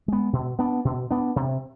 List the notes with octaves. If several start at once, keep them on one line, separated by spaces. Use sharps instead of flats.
G#3 B3
B2
B3 D4
B2
B3 D4
C3